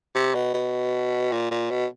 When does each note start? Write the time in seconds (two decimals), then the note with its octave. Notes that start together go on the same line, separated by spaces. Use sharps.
0.15 C3
0.35 B2
0.54 B2
1.32 A#2
1.51 A#2
1.71 B2